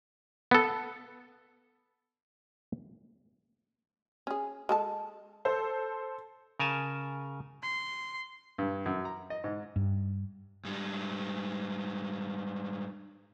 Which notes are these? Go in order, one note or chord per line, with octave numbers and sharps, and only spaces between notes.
B3 A4
C#4 G#4
G#3 A4 A5
A4 C5
C#3 A#4 G#5 A5
C6
G2
F#2
A#5
D#5
G#2
G2
G#2 G3